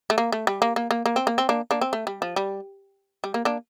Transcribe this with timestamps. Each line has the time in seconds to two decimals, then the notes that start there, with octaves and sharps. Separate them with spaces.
0.10 A3
0.18 A#3
0.32 A3
0.47 G3
0.62 A#3
0.76 A#3
0.91 A#3
1.06 A#3
1.16 C4
1.27 A#3
1.38 C4
1.49 A#3 D4
1.71 A#3 D4
1.81 C4
1.93 A3
2.07 G3
2.22 F3
2.36 G3
3.24 G3
3.34 A#3
3.45 A#3 D4